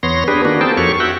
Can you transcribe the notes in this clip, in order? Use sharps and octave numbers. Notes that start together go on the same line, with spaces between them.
E2 B3 C#5 C6 A#6
B3 D4 G4 G#4 B4
D#3 A#3 D4 F#4
B3 C4 G#4 A#4 G5 A5
F2 F#4 G4 A4 C#5 C#6
F#4 E5 F#5 G5